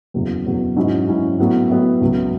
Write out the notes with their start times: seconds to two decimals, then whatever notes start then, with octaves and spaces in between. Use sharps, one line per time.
0.14 F#1 E2 B2 F#3
0.45 F#1 E2 B2 F#3
0.76 G#2 F#3 C#4 E4
1.08 G#2 F#3 C#4 E4
1.39 A2 F#3 B3
1.69 A2 F#3 B3
2.01 C#2 B2 F#3